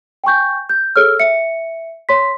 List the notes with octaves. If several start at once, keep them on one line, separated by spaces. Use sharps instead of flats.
G5 G#5 C#6 G6
G6
G#4 A4 C#5 E6 F6
E5 C#7
C#5 C6 B6